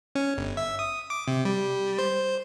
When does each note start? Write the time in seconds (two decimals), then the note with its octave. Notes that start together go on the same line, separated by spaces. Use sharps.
0.15 C#4
0.38 G1
0.57 E5
0.79 D#6
1.10 D6
1.28 C3
1.45 G3
1.99 C5